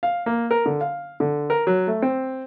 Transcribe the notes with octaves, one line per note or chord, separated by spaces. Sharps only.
F5
A#3
A#4
D3
F5
D3
A#4
F#3
A3
C4